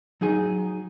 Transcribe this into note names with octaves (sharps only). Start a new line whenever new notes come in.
F#3 D#4 G#4 G#5